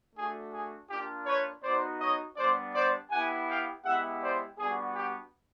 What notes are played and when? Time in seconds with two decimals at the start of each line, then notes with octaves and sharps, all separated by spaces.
0.15 A3 D4 F#4 G#4
0.52 G#4
0.89 A#3 D4 F4 G4
1.26 B4 C#5
1.63 B3 D#4 F#4 C5 D5
2.00 C#5 D#5
2.37 G3 B3 D4 C5 D5
2.74 C5 D5
3.11 B3 E4 G4 F#5 G#5
3.47 F5 G5
3.84 G#3 B3 E4 G4 E5 F#5
4.21 C5 D5
4.58 G3 B3 D4 F#4 G#4
4.96 G4